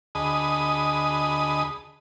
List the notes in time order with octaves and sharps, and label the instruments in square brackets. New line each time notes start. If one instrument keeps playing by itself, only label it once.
[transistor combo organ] D2 G#4 D#5 A5 B5 D#6